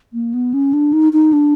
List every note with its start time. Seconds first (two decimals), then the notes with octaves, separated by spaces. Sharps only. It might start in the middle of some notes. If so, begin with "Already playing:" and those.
0.13 A#3
0.34 B3
0.54 C#4
0.73 D4
0.93 D#4
1.13 D#4
1.33 D4